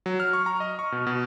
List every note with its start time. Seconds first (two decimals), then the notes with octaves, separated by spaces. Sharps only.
0.06 F#3
0.20 F6
0.33 C#6
0.46 A#5
0.60 D#5
0.79 C#6
0.92 B2
1.07 B2